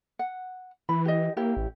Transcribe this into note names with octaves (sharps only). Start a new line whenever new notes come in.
F#5
E3 B5
G4 D#5
A#3 E4 G4 C#5
A1